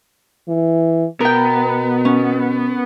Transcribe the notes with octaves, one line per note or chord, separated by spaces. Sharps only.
E3
B2 B3 A#4 G5
C#4